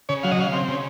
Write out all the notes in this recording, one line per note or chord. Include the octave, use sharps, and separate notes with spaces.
C#3 C#5
F#3 F5
D#5
C#3 F5
C4
C#3